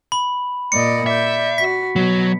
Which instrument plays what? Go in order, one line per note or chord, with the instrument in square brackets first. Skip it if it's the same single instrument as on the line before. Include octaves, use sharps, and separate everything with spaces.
[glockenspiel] B5
[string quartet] A#2 D5 D#5 [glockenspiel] C#7
[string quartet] D5 G6 [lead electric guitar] E5
[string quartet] F#4 [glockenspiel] B6
[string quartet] B2 [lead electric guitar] F#3